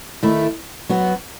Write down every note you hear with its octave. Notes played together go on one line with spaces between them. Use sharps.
D#3 A3 E4
F#3 B3 F#4